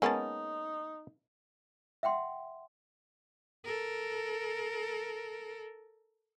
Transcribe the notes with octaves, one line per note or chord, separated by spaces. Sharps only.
G#3 A#3 B3 C#4 D#4 A5
E5 F#5 G5 C6
A4 A#4